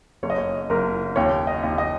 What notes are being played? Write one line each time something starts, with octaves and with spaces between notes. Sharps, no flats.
F#1 C#5
D#5
C#5
F#1 A#4
D#2 C#5
D#5
D#2
D#5